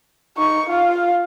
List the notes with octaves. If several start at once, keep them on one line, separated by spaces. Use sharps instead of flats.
D#4 C#6
F4 F5